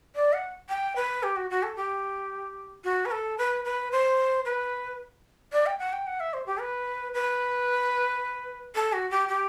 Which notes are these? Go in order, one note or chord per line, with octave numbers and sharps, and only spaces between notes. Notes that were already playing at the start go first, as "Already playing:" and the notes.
D5
F#5
G5
B4
G4
F#4
F#4
A4
G4
F#4
B4
A4
B4
B4
C5
B4
D5
G5
F#5
G5
F#5
E5
C5
G4
B4
B4
A4
F#4
G4
G4